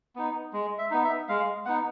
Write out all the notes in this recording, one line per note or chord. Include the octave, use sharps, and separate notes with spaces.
B3 D#4
G#3
E5
B3 D#4
E5
G#3 F5
B3 D#4 F#5